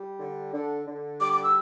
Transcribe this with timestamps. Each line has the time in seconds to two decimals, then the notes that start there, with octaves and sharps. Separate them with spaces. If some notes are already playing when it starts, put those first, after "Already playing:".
Already playing: G3
0.20 D3
0.53 D3
0.87 D3
1.21 G3 D6
1.33 D6
1.44 E6